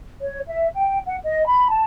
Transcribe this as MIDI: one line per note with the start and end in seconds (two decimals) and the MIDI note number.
0.21 0.38 73
0.47 0.66 76
0.76 0.99 79
1.06 1.16 78
1.23 1.45 75
1.47 1.67 83
1.70 1.83 81